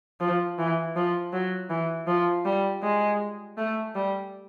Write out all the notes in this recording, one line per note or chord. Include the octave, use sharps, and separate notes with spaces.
F3
E3
F3
F#3
E3
F3
G3
G#3
A3
G3